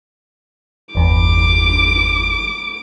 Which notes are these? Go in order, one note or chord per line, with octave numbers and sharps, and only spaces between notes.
G1 E2 D6